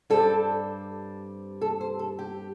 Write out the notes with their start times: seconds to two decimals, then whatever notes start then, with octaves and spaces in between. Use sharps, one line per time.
0.10 G2 G3 C4 A4
1.61 A4
1.81 C5
1.99 A4
2.19 G4